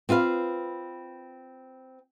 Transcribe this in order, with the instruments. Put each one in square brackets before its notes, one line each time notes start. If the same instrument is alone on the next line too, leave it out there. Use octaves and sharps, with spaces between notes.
[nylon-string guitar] C4 F4 B4 F5